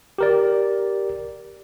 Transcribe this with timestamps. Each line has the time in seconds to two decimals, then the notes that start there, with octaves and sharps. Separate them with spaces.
0.18 G4 A#4 D5